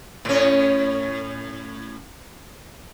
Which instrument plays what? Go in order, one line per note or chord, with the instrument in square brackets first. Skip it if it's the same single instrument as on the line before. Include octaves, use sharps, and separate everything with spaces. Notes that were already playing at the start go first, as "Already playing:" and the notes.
[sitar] A2 C#4